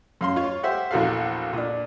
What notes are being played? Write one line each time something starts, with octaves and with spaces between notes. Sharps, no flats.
F#2 F5 C6
F4 C#5
G4 C5 E5 F#5
A#1 E2 F#4 A4 F5
A#2 D4